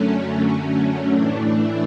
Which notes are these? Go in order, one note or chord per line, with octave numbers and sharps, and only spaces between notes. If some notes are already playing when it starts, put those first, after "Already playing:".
Already playing: F#2 D3 F#3 A3 C#4
A2 E3 A3 D4
E4